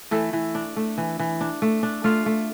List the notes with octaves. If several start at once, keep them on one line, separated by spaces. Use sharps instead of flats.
E3 A3 A4
E3
D4
A3
E3
E3
D4
A3
D4
A3 F4 F5
A3